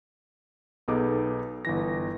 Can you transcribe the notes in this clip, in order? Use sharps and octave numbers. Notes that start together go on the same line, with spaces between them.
B1 B3 D#4 G#4 A4 D6
G1 E3 A#6